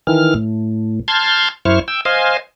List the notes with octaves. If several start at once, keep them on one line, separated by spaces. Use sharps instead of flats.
D#3 E3 F6
A2
A5 C6 F6 G6 G#6
F#2 E4 C5 C#6 F6
G5 E6
C5 D#5 F5 G#5